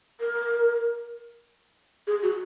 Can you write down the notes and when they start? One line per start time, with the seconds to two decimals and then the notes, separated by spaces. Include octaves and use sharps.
0.21 A#4
2.07 G#4
2.23 F#4